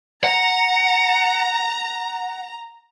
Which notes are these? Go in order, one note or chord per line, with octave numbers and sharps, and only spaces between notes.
F#5 A#5